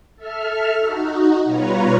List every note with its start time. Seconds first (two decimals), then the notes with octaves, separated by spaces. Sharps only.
0.16 A4 E5 F6
0.78 D#4 F#4
1.44 B2 G3 F4 B4 C#5 A#5